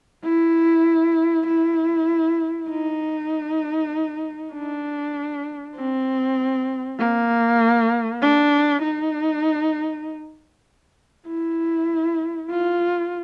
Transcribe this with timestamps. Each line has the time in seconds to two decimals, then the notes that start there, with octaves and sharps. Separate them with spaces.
0.24 E4
1.47 E4
2.69 D#4
4.53 D4
5.76 C4
6.98 A#3
8.21 D4
8.82 D#4
11.28 E4
12.50 F4